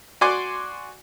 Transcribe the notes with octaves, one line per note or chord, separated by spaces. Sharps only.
F#4 D5 G#5 C6 D6 F#6